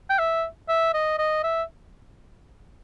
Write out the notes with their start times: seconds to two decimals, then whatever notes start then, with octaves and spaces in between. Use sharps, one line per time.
0.09 G5
0.18 E5
0.68 E5
0.93 D#5
1.18 D#5
1.43 E5